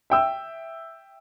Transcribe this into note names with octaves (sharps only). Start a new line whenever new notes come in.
E5 G5 E6